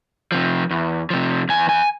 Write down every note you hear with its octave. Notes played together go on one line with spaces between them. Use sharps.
C3 F3
E2
C3 F3
E2 G#5
G#5